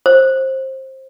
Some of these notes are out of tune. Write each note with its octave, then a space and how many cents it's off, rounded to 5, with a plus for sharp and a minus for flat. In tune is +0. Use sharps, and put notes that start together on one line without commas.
C5 +20